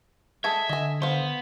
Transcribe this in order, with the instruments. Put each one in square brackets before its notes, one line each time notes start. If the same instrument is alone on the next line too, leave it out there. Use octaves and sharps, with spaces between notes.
[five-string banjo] G#3 G#4 A4 [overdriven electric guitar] E5 [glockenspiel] G#6
[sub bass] D3 [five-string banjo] D#5 G#5
[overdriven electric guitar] B3 [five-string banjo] C5 F5